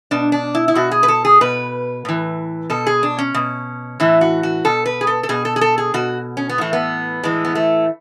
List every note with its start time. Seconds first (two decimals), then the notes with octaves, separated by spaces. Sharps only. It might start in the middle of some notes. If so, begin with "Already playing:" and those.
0.11 B2 D4
0.32 D4
0.55 E4
0.68 E4
0.75 B2 F#4
0.91 G#4
1.03 B4
1.08 A4
1.25 G#4
1.41 B2 B4
2.05 A2 E3
2.70 B2 A4
2.87 G#4
3.03 D4
3.19 C#4
3.34 B2
4.00 A2 E3 E4
4.21 F#4
4.43 F#4
4.65 B2 A4
4.86 B4
5.01 G#4
5.07 A4
5.23 A4
5.29 B2 G#4
5.45 A4
5.56 G#4
5.61 A4
5.78 G#4
5.94 B2 F#4
6.37 C#4
6.49 B3
6.58 A2 E3 A3
6.73 B3
7.23 A2 E3 G#3
7.45 B3
7.55 A3